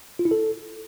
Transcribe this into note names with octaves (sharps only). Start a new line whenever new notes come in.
F4
E4
A4